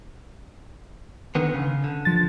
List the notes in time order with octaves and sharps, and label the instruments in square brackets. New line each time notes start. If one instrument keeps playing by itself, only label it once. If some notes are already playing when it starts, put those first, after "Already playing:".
[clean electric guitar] D3 D#3 B3
C#3
D3
[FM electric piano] F3 A6